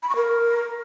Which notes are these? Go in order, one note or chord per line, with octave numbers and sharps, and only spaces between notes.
B5
C#6
A#4